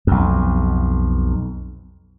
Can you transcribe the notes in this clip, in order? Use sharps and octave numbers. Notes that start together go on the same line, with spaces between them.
B1 F2